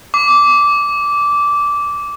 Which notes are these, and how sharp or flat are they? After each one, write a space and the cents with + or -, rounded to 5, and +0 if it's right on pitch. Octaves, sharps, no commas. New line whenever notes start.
D6 -15